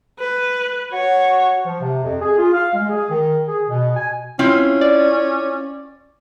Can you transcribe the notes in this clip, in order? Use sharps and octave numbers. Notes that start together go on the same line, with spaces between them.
B4
F#4 C#5
F3
C3
F2
G#4
F4
F5
G#3
G#4
D#3
G#4
B2
G#5
C4 C#4 E4 F4
D5